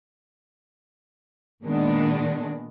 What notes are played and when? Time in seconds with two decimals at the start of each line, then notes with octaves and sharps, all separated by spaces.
1.64 A#2 D#3 G#3 B3 D4